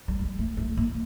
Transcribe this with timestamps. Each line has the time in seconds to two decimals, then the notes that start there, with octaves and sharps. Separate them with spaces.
0.08 G3
0.19 G#3
0.38 A3
0.57 A3
0.77 A#3